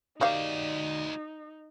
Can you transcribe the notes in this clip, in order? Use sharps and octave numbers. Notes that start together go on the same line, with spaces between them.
A#3 D#4 F#4 G4 D5 F5